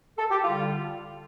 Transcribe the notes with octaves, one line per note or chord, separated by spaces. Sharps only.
A4
G4
D3 G3 F4